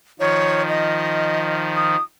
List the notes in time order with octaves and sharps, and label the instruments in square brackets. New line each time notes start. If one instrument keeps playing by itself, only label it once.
[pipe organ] D#3 F3 [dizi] C#5
[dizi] D#5
D#6